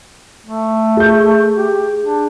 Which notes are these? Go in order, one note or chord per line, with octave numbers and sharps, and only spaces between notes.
A3
G#4 G6
G4
D4